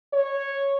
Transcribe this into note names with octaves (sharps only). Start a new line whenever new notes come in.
C#5